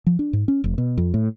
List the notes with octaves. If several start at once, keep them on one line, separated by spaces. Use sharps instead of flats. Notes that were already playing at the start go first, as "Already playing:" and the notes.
F3
D4
G#2
C#4
F1
B2
F2
A2